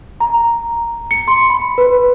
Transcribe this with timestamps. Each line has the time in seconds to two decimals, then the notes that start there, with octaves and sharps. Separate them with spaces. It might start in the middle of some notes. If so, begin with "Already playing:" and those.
0.20 A#5
1.11 C#7
1.28 C6
1.50 B5
1.78 B4